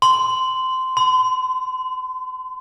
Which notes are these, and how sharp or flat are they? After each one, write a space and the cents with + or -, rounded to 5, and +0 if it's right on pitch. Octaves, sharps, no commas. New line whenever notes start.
C6 -15
C6 -45